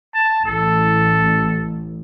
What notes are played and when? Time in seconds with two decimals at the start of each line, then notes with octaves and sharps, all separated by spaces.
0.15 A5
0.46 A1 A4